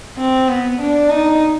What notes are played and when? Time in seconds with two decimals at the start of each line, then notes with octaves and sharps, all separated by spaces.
0.18 C4
0.49 B3
0.81 D4
1.11 D#4